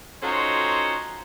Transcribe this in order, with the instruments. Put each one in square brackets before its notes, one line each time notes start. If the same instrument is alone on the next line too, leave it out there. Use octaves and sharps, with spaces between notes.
[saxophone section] C#4 D#4 F4 F#4 A4 C5